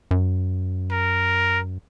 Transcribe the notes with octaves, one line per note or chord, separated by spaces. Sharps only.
F#2
A#4